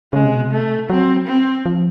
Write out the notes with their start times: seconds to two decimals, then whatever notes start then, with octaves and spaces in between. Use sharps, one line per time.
0.13 C#3 G#3
0.24 C3
0.35 B2
0.46 C3
0.52 A3
0.90 F#3 C4
1.27 C4
1.66 F3